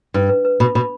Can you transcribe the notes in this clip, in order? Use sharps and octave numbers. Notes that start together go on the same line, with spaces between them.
G2 B4
B4
B4
B2 B5
B2 B5